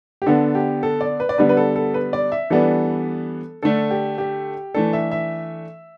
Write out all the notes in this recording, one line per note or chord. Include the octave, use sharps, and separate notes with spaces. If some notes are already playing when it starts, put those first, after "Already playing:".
G4
D3 B3 D4 A4
G4
A4
D5
B4
D5
D3 G3 B3 D4 B4
B4
A4
A4
B4
D5
E5
E3 G3 B3 D4 A4
D3 A3 D4 A4
G4
G4
E3 A3 D4 A4
E5
E5